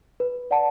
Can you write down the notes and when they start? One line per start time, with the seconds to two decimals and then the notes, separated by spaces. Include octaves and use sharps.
0.20 B4
0.51 D5 F#5 A5